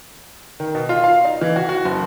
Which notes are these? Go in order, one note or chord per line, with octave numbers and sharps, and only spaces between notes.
D#3
B2
F4
F5
D#4
E3
F#4
F#4
F#1